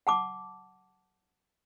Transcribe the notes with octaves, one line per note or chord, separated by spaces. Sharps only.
F#5 A5 D6